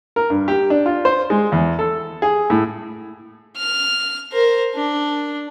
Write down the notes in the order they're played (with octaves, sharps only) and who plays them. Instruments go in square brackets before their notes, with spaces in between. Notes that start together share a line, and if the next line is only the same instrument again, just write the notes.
[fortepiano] A#4
G2
G4
D4
F4
C5
G#3
E2
A4
G#4
A2
[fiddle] F6
A#4 C5
D4